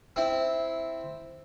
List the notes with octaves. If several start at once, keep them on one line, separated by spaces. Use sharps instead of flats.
C4 E4